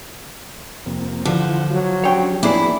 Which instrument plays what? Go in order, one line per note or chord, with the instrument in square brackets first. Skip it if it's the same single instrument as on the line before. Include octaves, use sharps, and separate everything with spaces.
[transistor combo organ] F2 C3 A#3
[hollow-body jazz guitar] D3 [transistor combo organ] E3 F4 F#5 [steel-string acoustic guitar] F3
[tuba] F#3 [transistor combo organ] F4
[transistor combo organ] C#4 D4 G4 [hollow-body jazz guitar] C#5 G5
[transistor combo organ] E3 F3 B3 [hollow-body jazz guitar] A#3 D4 G#4 [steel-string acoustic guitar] E4